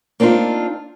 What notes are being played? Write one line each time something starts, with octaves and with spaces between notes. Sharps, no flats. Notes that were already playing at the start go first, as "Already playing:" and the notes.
A#3 C4 D4 D#4 F4